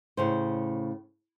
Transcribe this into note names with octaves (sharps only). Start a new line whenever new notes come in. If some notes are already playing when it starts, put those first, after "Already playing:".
A2 C#3 C5